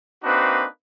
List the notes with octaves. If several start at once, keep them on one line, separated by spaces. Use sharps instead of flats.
A#3 C4 D4 D#4 F#4 B4